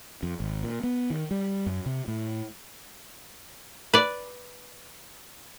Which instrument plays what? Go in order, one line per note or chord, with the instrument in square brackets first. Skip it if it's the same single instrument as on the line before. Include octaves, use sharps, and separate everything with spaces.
[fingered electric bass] F2
G#1
A#2
B3
D#3
G3
F#2
C3
A2
[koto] B4 D5